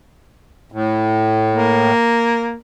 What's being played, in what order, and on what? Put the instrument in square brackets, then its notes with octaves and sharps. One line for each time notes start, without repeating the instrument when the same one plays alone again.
[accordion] A2
[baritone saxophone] A#3